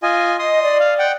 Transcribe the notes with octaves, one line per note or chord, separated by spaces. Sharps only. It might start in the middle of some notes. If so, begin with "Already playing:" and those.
F4 D#5 G#5
D#5 C6 D#6
D5
F5
F#5 G5